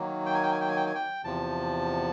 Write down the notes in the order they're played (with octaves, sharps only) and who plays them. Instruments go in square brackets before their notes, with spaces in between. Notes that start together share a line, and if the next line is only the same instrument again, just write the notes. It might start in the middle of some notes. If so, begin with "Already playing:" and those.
Already playing: [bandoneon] D#3 F#3 A#3
G5
G#5
G5
G#5
G5
G#5
G5
G#5
G5
E2 C3 F3 A5